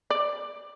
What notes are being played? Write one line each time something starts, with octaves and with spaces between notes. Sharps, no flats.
D5